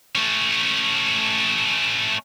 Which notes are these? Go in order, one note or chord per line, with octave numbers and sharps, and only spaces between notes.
A3 C#4